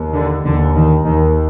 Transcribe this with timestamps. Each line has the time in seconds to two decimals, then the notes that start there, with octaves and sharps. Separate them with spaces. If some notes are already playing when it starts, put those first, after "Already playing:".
Already playing: D#2
0.14 D3
0.44 D#2 D3
0.75 D#3
1.05 D#2 D#3